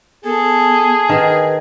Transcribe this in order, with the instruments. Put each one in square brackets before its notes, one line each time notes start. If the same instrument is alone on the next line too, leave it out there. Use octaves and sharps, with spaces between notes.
[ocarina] B3 [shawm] G#4 [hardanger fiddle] A4
[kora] D#3 [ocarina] B4